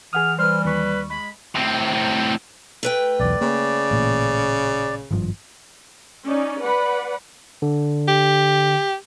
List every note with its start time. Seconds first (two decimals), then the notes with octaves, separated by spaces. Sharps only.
0.13 E3 G#4 F#5 D#6 F6
0.39 G3 B4 C5 F6
0.65 D#2 B4 C#6
1.10 G#3 B5
1.55 A2 C4
2.83 A3 B4 G5
3.20 B1 E2 D5
3.41 C#3 A#3
3.91 A1 A#2
5.11 G#1 G2 F3
6.26 C#4 D#4 D5
6.62 B4 D5 F#5 B5
7.62 D3
8.08 G4